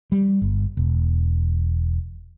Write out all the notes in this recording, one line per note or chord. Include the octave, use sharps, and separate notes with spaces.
G3
G1
E1